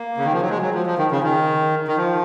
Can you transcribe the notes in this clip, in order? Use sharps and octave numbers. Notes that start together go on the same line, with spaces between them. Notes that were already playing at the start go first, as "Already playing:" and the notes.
Already playing: A#3
C#3
D#3
F3
F#3
G#3
F#3
F3
F3
D#3
C#3
D#3
D#3
F3